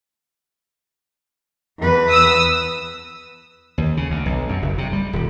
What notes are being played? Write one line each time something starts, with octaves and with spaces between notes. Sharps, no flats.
E2 B4
D#6 E6
D#2
C#3
D2
B1
F#2
F#1
C3
G3
D#1